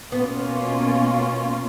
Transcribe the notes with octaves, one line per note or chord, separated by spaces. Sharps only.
B2 A#3 B3 C#4 F4